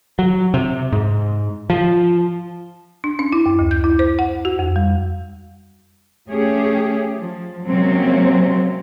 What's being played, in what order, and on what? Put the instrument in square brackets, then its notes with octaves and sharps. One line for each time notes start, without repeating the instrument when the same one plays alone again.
[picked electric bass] F#3
C3
G#2
F3
[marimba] D4
C#4
E4
F#2
D2
G6
E4
C5
F#5
F#4
F2
G3
[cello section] A3 C#4 G4 G#4
F3
C3 F#3 G#3 A#3 C4 C#4